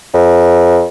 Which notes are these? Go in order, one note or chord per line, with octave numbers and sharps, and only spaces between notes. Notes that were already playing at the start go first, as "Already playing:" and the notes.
F2